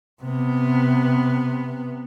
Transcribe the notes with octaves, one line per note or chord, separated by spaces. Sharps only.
C3 B3